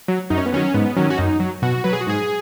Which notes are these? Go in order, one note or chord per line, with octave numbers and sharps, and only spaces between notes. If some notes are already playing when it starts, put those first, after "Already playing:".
F#3
F#2 D#4
C#4
B3
D#3 F#3 C#4
G#2 B3
D#3 F#3 C#4
F#4
F#2 D#4
F#3
B2 F#4
F#3 B4
G#4
F#4
G#2 G#4